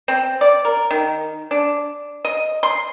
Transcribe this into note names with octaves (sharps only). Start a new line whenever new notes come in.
C4
D5
A#4
D#3
D4
D#5
C6